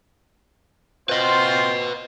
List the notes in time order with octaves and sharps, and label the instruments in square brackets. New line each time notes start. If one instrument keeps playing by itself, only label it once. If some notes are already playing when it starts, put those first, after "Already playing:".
[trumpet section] C4 F4 C5 [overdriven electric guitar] B4 D#5